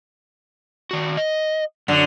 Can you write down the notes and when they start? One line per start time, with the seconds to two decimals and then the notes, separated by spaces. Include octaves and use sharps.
0.91 D#3 F#4
1.17 D#5
1.88 F#2 D3 F#3